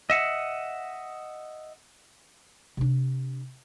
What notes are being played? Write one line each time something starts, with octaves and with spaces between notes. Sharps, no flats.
D#5 E5 F#5
C3 D4